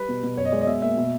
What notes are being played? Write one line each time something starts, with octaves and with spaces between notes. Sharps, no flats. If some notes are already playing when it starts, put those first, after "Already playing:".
Already playing: G3 B4
B2
B2
F#2 C#5
D#5
G#3 D5
D#5
B2 E5
A#3 E5
B2